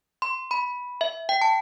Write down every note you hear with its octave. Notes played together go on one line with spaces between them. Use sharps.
C6
B5
E5
G5
A5